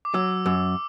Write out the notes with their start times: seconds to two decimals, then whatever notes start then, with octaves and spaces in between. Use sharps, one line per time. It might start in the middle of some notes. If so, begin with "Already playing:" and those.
0.05 D6
0.14 F#3 E6
0.46 F#2 E6